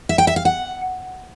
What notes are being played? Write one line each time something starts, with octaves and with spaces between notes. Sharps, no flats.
E5
G5
E5
F5
F#5